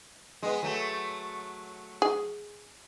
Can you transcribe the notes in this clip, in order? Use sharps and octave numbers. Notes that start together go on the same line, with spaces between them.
G#3 B3
F#3 A3
G#4